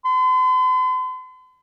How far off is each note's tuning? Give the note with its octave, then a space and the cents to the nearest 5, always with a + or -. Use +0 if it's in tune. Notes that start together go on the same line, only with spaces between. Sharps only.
C6 -45